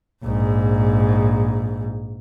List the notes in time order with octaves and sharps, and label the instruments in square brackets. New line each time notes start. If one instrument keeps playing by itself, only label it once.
[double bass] A#1 G#2